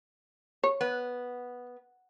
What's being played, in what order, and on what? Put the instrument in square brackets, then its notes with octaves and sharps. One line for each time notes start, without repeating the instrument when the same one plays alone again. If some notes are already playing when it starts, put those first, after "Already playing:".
[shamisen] C#5
[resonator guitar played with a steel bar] B3